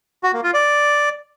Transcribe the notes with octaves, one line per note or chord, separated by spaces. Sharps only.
F#4
A#3
F4
D5